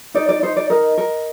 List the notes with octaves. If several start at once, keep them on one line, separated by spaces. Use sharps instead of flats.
D#4 D5
D5
D#4 C5
D5
A#4 D#5
A#4